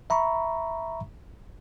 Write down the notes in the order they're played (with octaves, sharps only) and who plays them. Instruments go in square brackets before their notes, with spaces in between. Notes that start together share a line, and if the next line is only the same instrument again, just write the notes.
[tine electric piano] E5 A#5 B5 C#6